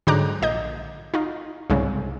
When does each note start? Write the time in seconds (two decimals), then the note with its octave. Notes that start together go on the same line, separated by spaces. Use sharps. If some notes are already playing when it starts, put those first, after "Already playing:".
0.07 G#2 D3 F#3 A#5 D6 F#6
0.42 A#1 D#5 G6
1.14 D#4 F4
1.70 C2 G#2 C#3